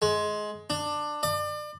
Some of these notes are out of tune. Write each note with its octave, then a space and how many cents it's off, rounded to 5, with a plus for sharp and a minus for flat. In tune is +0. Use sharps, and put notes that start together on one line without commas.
G#3 +15
D4 +15
D5 +35